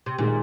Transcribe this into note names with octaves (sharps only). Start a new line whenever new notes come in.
C3
A#2 D#3 G#3